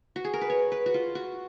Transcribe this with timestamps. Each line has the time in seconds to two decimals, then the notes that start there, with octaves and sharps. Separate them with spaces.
0.16 F#4
0.24 G#4
0.33 A#4
0.41 B4
0.50 C#5
0.72 B4
0.86 F#4
0.94 F4
1.15 F#4